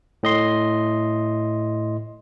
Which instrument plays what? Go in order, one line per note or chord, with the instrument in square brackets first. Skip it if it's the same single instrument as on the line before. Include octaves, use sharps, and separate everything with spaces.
[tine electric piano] A2 D#5 C6